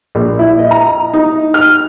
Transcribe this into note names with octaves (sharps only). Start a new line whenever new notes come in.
A#1
E4
D#5
A#5
D#4
F6